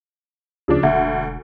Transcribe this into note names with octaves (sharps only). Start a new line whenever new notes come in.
D2 C#3 F3 D4
E1 D2 E5 F#5